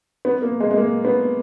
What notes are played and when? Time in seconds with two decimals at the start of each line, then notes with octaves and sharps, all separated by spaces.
0.25 B3
0.42 A#3
0.60 G#3
0.71 G#3
0.77 A#3
1.05 B3